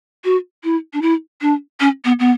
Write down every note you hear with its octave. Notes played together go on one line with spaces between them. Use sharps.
F#4
E4
D4
E4
D4
C#4
B3
B3